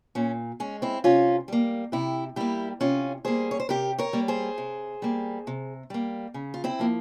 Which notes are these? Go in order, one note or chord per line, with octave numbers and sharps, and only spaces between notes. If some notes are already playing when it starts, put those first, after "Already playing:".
A#2 C#4
G#3 C#4
C4 E4
C3 C#4 F4
G3 A#3
C3 E4 G4
G3 A#3 E4 G4
C3 C#4 F4
G3 A#3 G#4 C5
C#5
C5
C3 G4 A#4
A#4 C#5
G3 A#3
G#4 C5
C3
G3 A#3
C3
G3 A#3
C#3
F4
C4 E4
F3 A#3